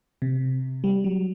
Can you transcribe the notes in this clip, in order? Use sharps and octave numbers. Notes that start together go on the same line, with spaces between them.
C3
G3
F#3